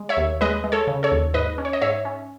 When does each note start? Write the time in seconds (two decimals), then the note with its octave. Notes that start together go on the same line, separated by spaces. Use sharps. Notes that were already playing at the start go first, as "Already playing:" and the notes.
Already playing: G#3
0.09 C#5 E5
0.17 D#2
0.41 G#3 B4 D#5
0.64 G#3
0.72 A4 C#5
0.87 C#3
1.03 A4 C#5
1.12 D#2
1.34 G#2 B4 D#5
1.58 C#4
1.65 C#5
1.73 D#5
1.81 G#2 C#5 E5
2.05 C#4